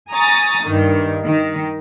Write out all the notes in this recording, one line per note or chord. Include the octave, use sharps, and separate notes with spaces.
G#5 A#5 C#6 D#6 A6
G2 D#3
D#3